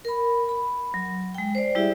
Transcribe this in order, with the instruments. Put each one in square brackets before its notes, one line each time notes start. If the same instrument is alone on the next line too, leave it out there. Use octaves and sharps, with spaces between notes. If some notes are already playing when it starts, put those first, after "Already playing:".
[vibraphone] A#4 B5
B5
F#3
G#3 G5
C5 D5
G3 E4 G4 G#4 D5 E5